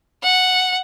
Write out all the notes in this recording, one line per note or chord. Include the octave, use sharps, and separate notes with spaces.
F#5